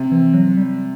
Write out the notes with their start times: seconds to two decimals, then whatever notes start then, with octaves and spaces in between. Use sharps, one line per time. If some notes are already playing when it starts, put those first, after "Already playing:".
Already playing: C3
0.12 E3
0.34 F#3
0.57 G3